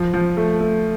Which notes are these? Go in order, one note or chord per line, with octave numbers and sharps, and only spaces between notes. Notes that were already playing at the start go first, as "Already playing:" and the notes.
Already playing: F3
F3
A3
A3